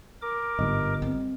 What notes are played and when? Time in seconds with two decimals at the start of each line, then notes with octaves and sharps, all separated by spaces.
0.22 A#4 D6
0.59 G1 G#2 G3 D#5
1.02 C4